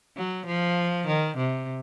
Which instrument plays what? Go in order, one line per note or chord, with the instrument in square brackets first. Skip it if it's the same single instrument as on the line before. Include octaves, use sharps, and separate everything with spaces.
[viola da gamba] F#3
F3
D#3
C3